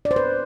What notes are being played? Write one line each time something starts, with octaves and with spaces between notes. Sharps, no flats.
D5
C5
B4